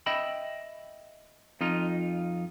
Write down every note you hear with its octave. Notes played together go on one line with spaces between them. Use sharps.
D#5 E5 G5 B5
F2 D#4 F4